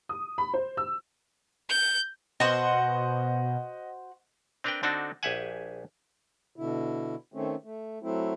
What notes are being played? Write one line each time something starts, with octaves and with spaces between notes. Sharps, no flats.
D#6
B5
C5
E6
G6
B2 F#4 C5 D#5 F#5
C4 D4 A#4 B4 D5 G5
D3 C4 D4 D#4 F#4 A4
A#1 G4 G#4 E5 F#5 G#5
B2 D3 E4
D#3 A3 C4 C#4
A3
F#3 A3 C4 E4